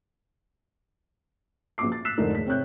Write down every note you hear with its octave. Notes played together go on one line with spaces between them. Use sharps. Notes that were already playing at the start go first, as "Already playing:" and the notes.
A#1 B3 C#4 F#4 D6 C7
A6
E6 F#6 B6 C7 E7
F1 G#2 D3 G#3 D#4 A#4
E1 B6
C3 C4 C#5 F#6 G6